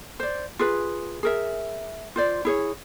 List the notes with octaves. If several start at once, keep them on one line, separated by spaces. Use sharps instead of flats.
C5 D5
F4 G#4 B4
G#4 A#4 E5
F4 C5 D5
E4 G#4 C#5